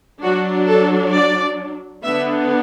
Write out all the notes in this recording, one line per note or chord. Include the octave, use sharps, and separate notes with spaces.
F#3 D4 F#4
A4
D5
D3 B3 D4 E5